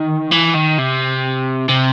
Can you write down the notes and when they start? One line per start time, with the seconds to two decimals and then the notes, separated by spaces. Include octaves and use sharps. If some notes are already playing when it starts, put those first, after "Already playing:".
Already playing: D#3
0.32 E3
0.55 D#3
0.79 C3
1.69 C3